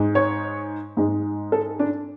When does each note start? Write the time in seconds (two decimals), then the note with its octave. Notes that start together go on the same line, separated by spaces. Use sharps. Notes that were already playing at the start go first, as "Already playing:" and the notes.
Already playing: G#2 G#3
0.15 C#5
0.97 G#2 G#3
1.52 A4
1.79 D4